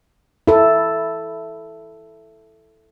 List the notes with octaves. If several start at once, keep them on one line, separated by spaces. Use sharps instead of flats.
E4 A4